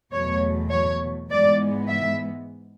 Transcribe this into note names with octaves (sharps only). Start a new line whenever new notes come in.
E2 B2 F#3 A3 C#5
C#5
G#2 E3 G#3 B3 D5
E5